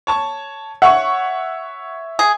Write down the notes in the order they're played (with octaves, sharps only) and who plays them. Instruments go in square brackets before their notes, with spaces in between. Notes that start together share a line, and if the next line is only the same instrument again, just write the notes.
[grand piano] C#5 A5 C#6
[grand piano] C#5 E5 [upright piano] F#5 C#6
[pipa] G#4